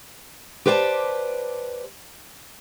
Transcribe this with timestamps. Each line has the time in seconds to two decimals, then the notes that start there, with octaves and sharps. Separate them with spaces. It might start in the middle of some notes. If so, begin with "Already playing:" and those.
0.66 G4 B4 C5 D5 G#5 A5